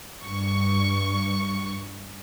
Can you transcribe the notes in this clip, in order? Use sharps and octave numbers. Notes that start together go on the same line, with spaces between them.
G2 C#6